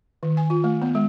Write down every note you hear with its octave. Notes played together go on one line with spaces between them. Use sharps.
D#3
G#5
F4
A3
B3
G#3